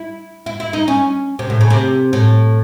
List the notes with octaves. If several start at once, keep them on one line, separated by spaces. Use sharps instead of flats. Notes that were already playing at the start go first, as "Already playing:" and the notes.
Already playing: E4
E4
E4
D#4
C#4
C3
A2
C#3
C3
A2